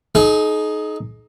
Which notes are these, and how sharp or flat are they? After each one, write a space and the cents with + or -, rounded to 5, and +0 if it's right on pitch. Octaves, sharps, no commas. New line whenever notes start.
D#4 +0 G#4 +45